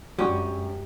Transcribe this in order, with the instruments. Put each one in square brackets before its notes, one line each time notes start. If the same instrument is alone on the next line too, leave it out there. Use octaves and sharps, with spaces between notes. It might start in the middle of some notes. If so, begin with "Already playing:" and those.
[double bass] F#2 G#3 [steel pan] G3 F#4 [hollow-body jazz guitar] C#4 [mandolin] G4